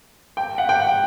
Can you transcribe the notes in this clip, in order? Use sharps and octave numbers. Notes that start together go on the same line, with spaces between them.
G5
F#5
G5
F#5